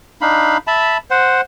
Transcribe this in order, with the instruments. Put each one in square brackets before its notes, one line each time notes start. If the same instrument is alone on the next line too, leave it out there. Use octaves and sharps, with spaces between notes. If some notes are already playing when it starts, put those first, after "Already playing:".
[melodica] D4 D#4 F5 B5
E5 A5 B5
C5 F#5